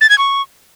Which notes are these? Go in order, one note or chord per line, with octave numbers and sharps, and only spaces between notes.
A6
G#6
C#6